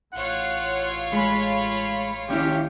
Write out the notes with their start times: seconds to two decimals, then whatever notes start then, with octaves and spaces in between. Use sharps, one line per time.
0.13 A1 F4 C#5 F#5
1.13 G#3 B5
2.29 D#2 C#4 E4 G4